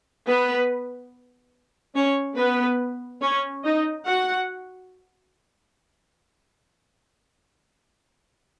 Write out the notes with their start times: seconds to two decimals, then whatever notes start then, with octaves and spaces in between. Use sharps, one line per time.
0.27 B3 B4
1.96 C#4 C#5
2.38 B3 B4
3.22 C#4 C#5
3.64 D#4 D#5
4.06 F#4 F#5